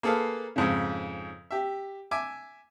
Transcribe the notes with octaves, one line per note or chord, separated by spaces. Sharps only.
A#3 G#4 A4 B4 F5
F2 G#2 C#3
G4 E5
E5 G#5 D6